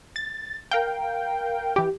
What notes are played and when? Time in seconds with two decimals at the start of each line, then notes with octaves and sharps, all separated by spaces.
0.16 A6
0.71 A#4 F5 G5
1.76 E3 G4